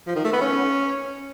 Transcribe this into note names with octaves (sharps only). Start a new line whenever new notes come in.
F3
D#3
A3
B3
C#4